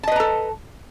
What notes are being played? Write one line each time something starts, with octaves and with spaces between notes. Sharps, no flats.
A4 B4 D#5 A5 A#5